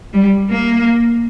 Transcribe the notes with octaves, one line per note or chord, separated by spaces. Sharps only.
G3
A#3